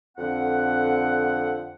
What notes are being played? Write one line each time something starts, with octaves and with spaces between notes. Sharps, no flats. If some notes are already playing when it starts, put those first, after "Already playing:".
F2 D3 C4 F#5